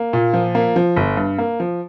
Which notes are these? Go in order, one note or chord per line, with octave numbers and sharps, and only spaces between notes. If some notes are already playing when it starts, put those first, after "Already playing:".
Already playing: A#3
A#2
F3
A#3
F3
G1
G2
A#3
F3